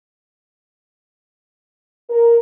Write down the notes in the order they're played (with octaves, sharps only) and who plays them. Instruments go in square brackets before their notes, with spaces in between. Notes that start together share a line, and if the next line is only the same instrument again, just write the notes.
[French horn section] A#4